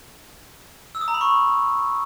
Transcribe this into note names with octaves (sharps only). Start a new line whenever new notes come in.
E6
D#6
A#5
B5
C#6